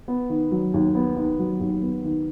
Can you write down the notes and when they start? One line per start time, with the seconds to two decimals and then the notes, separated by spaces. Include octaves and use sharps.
0.08 B3
0.30 D#3
0.51 F#3
0.74 D#2
0.95 B3
1.17 D#3
1.39 F#3
1.60 D#2
1.82 B3
2.05 D#3